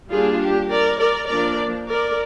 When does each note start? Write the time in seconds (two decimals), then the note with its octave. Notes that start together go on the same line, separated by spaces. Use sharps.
0.09 G3 A#3 D4 F4 G#4
0.40 G4
0.69 A#4 D5
0.99 A#4 D5
1.28 F3 A#3 D4 A#4 D5
1.89 A#4 D5